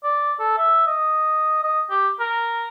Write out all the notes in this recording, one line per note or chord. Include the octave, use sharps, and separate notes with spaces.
D5
A4
E5
D#5
D#5
G4
A#4